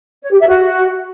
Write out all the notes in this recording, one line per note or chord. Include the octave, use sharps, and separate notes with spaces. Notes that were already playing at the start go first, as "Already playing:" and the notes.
C#5
G4
E5
F#4